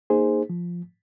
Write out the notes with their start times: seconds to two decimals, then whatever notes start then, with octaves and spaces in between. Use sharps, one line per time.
0.10 A#3 D#4 G#4 C5
0.50 F3